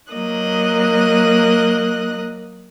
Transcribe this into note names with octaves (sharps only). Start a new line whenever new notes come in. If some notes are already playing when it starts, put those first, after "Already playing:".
F#3 A#3 D#5 F#6